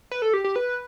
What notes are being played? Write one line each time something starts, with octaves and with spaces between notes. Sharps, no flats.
B4
A4
G4
G4
B4